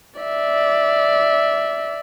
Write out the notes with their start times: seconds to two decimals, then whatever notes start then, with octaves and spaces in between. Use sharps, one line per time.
0.20 D5 E5